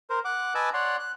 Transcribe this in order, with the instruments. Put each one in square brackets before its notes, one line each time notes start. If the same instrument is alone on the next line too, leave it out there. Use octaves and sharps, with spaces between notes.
[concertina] A#4 C5
F#5 D6
B4 D#5 G#5 A5 D6 E6
C#5 D5 F#5 C6
F#6